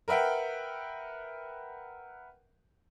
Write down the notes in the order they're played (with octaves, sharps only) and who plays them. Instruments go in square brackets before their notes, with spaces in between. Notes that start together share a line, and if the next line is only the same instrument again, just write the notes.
[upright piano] A#4 B4 E5 F#5 G5